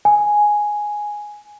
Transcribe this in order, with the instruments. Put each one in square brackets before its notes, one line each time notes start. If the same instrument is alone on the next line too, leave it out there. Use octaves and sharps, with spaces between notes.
[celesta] G#5